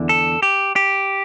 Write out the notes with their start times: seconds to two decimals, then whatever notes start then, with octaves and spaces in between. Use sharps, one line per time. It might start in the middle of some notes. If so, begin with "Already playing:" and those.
Already playing: E2 D3
0.09 A4
0.42 G4
0.76 G4